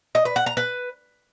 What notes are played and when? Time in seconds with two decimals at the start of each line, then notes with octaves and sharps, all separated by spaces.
0.15 D#5
0.25 B4
0.36 F#5
0.46 A#5
0.57 B4